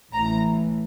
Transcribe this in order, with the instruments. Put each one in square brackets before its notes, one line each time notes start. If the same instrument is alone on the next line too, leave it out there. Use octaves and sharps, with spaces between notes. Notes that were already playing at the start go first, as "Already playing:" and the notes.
[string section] A1 A2 E3 A#5